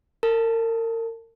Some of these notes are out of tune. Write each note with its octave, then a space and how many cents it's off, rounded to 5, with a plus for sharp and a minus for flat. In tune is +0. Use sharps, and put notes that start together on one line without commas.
A#4 -35 A5 +0